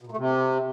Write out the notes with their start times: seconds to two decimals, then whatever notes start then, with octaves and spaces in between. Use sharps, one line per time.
0.02 B2
0.07 A#2
0.12 A3
0.17 C3